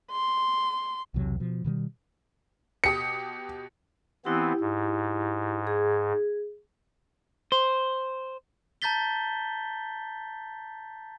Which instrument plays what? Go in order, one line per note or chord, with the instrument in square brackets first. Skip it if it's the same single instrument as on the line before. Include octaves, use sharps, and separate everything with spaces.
[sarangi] C6
[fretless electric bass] B1 E2 C3 F#3
B2 F3
B2 D#3 F3 G3
[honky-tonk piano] B2 G4 D#6 [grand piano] C#7
[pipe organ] E3 B3 C4 [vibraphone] E4 G4
[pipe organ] G#2
[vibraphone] G#4
[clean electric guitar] C5
[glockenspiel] A5 A#5 G6 A6 B6 G7